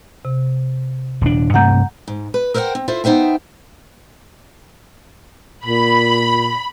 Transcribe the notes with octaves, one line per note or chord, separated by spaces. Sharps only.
C3
D#1 D4
G2 C3 A3 F#5 A#5 G6
G#2
B4
A#4 C5 E5 F#5 G5
C4
E4 F4 A4 C5 E5
B3 D#4 C5 E5 G5
A#2 B5